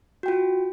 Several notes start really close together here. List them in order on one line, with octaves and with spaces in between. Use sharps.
F#4 G5 F4